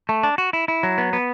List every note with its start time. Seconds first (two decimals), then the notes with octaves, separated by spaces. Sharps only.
0.09 A3
0.23 D4
0.38 F#4
0.53 E4
0.68 E4
0.83 F#3
0.98 B3
1.13 B3